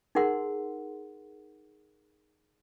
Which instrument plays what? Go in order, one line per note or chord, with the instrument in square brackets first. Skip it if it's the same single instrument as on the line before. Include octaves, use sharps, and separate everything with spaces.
[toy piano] D#4 G#4 A#4 F#5 C6